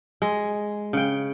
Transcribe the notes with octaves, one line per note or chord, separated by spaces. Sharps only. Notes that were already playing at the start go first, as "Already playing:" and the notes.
G#3
C#3 G5